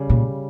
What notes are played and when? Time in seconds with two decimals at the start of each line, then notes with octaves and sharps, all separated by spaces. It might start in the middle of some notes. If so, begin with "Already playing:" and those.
Already playing: C#3 G3
0.10 A#2